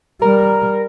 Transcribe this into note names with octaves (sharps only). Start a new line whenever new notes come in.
G3 A#4